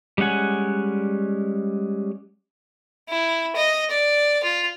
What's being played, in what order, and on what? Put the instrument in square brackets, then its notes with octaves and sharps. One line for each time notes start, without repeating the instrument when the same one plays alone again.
[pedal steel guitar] G3 G#3 C#4 F#5 G#5
[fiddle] E4
D#5
D5
F4